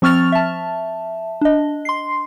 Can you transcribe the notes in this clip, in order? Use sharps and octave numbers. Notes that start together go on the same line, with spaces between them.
F3 C4 C#6 F6 A6 F7
E5 A5
D4 D#5
C6 C7